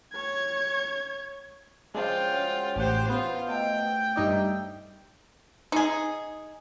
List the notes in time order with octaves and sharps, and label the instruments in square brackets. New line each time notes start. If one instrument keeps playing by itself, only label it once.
[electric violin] C#5 G#6
[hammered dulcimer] C#3 F3 D4 [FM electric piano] G#3 [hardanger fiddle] F4 G5
[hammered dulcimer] C#3 F#4 G#4
[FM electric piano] A1 F#5 [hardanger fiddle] G4 C5
[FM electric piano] B3 [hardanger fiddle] F4
[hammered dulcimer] A3 A4 D#5 [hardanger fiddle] G5
[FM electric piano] G2 D#4 D5 [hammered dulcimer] E5 C6
[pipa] D#4 G#4